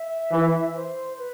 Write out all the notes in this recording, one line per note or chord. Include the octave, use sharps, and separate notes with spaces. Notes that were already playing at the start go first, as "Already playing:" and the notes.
Already playing: E5
E3
C5
B4